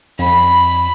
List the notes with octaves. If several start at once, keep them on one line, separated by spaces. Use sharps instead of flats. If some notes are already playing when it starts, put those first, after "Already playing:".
F2 B5